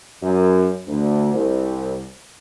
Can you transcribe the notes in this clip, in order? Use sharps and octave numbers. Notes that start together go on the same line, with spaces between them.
F#2
D2
C2